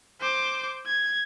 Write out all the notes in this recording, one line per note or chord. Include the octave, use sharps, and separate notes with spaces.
C5 D6
G#6